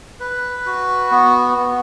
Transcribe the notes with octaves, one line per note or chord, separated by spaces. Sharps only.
B4
F#4
B3
B3